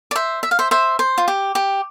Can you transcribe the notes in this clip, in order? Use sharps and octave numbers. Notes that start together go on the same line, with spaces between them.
D5
C5 E5
E5
F5
C5 E5
C5 E5
C5
F4
G4
G4